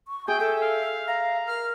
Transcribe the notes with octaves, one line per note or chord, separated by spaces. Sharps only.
C#6
G#4 E5 G5
A4 G5
F5
F5 A#5
A#4 F6